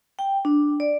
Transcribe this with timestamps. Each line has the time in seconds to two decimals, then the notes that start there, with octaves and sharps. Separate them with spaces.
0.19 G5
0.45 D4
0.80 D5